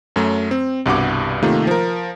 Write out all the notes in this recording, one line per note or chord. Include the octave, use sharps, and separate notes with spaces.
F#2 F#3 A3
C4
C2 G2 B2 F#5 D6
C3 D#3 A3 A#3 D#4 F4
F3 A#4